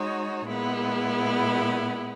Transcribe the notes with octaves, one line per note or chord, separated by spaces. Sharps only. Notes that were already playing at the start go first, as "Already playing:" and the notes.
Already playing: G#3 D#4 F#4 C#5
A#2 G#3 B3 E4